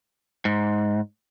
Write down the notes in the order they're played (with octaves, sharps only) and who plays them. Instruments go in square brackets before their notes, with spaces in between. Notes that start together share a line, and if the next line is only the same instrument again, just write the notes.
[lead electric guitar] G#2